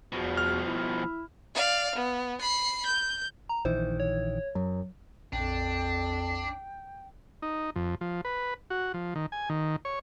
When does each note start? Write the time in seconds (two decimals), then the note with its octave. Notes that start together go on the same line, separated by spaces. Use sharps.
0.12 E2 B2 F3 F#4
0.37 F6
0.68 E4
1.54 D5 F5
1.95 B3
2.41 B5 C7
2.86 G6
3.49 A#5
3.65 A#1 D#3 E3 C5
4.00 C#5
4.55 F#2 F#3
5.33 A#1 F2 D4 G5
7.42 D#4
7.76 F2
8.01 F3
8.25 B4
8.70 F#4
8.94 F3
9.15 D#3
9.32 G#5
9.49 D#3
9.85 C#5